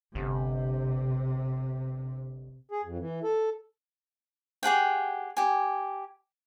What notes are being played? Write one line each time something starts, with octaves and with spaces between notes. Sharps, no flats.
G1 C3
G#4
F2
E3
A4
G4 G#4 F#5 G5
G4 G#5